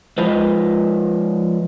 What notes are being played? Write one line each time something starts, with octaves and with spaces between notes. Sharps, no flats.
F3 G#3 F4 B4 C5 D#5